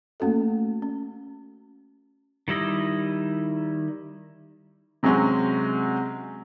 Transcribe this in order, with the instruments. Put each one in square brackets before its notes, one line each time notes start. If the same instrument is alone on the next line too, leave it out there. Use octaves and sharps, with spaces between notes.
[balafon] A3 A#3 C#4 F#4 A4
C#4
[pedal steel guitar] D#3 G3 E4 D#5
[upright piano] C3 F#3 G#3 C4 C#4